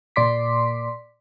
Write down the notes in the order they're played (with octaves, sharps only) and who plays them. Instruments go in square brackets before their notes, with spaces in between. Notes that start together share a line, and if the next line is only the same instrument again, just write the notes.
[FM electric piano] A#2 D5 C6 D6 B6